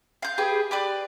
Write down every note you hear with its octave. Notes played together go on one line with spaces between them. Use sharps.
F5 G6
G4 G#4 B4
G4 B4 D5